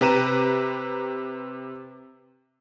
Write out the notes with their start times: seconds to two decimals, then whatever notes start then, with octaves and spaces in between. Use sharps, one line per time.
0.01 C3 G4 B4 A#5 D#7 E7